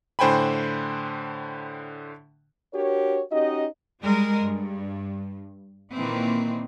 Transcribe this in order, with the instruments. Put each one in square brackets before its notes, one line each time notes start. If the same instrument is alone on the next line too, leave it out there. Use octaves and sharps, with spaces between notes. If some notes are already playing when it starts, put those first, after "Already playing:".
[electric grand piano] A2 D3 C5 G5 G#5 B5
[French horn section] D4 F#4 G4 A#4 C#5
C#4 D#4 F#4 G4 D#5
[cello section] G3 G#3 A#4
G2
A#2 D#3 E3 A#3 C4